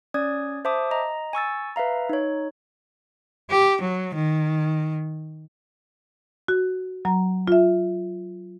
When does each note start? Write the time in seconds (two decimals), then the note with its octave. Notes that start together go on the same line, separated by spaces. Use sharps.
0.14 C#4 D5 D#6 G#6
0.65 C5 E5 A5 D6 D#6
0.91 D#5 A#5
1.33 G#5 C#6 E6 A6
1.76 B4 E5 F5 A#5
2.09 D#4 C#5
3.50 G4
3.81 F#3
4.15 D#3
6.48 F#4
7.05 F#3 A#5
7.48 F4 E5